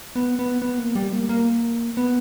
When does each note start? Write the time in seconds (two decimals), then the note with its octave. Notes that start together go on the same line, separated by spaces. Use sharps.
0.16 B3
0.39 B3
0.62 B3
0.79 A#3
0.95 G3
1.13 A#3
1.29 A#3
1.97 B3